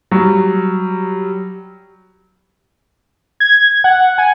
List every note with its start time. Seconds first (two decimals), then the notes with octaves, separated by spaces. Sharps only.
0.11 F#3 G3
3.40 G#6
3.84 F#5
4.18 G#5